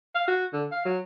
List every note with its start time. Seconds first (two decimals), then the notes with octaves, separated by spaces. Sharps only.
0.15 F5
0.28 F#4
0.53 D3
0.72 F5
0.85 F#3